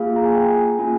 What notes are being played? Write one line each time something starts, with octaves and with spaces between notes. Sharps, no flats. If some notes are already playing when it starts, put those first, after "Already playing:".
Already playing: A#3 F4 G#4 F5
A#5
G#5
G5
A#3 C#4 F4 G#4 G#5